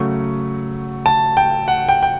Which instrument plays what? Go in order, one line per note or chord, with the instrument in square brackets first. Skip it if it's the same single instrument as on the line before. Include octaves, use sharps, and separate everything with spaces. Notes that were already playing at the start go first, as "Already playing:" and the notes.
Already playing: [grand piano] C#3 F#3 A3 C#6
A5
G5
F#5
G5
G5